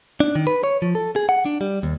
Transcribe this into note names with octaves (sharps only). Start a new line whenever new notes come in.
D4
D#3
B4
C#5
F3
A4
G#4
F#5
D4
G3
D#2